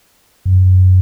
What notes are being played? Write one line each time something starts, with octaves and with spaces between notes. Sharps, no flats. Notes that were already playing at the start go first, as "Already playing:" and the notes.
F#2